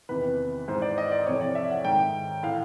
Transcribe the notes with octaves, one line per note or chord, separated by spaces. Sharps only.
E2 C3 D#3 B4
G#2 E3 C5
D5
D#5
D5
F2 C3 E3 C#5
D5
E5
F#5
G#2 D#3 G5
A2 E3 F5